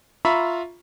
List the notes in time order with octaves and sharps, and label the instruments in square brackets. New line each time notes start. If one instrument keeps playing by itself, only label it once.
[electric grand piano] F4 E5 A#5 B5 C#6